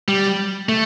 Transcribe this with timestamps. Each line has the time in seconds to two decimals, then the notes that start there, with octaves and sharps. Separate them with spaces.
0.08 G3
0.69 A3